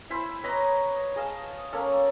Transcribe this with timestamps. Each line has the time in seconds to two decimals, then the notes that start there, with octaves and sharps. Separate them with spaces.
0.10 E4 C5 B5
0.43 B4 C#5 D#5 A#5
1.16 G#4 D#5 F5 A5
1.73 A#3 C#4 A4